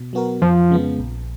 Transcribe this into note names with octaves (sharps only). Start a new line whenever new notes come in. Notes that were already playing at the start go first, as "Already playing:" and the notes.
Already playing: B2
F#3 B3 F#4 A#4
F2 F3
C#3 G#3 B3
A#1